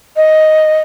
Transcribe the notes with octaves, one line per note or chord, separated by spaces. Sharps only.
D#5